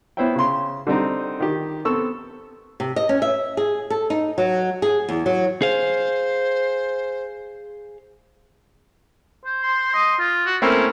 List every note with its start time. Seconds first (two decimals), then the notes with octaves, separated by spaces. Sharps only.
0.17 B3 E4 C5 C#5 E5 G5
0.36 C#3 C6
0.87 D3 G3 C4 D#4
1.40 D#3 G4
1.85 B3 C4 A4 C#6 E6
2.80 C3
2.96 D#5
3.09 C#4
3.22 E5
3.57 G#4
3.90 A4
4.10 D#4
4.38 F#3
4.82 G#4
5.09 E2
5.26 F#3
5.62 G#4 C5 F5
9.45 C5
9.63 C6
9.94 D#5
10.19 F4
10.46 F#4
10.62 A3 A#3 C4 C#4 E4